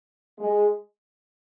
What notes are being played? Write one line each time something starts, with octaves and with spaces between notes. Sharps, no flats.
G#3